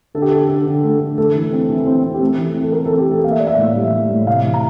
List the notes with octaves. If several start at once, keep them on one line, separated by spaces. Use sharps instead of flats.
D3 A4
G4
D3 A4
D3
D3
A3
D3
A3 A4
E3
C4
E3
C4
C4
G4
A3 A4
E3
C4
A4
C4 A#4
A4
E3
G4
A3 A4
A#3 F5
E5
A#3 D5
E5
A2
G3
G3
A2
C3 F5
E3
A#5